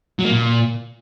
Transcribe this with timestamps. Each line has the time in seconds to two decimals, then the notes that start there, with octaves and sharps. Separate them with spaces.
0.19 F#3
0.25 A#3
0.31 A#2